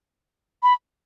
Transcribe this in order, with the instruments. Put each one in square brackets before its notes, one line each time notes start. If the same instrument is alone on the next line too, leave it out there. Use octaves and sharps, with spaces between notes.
[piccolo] B5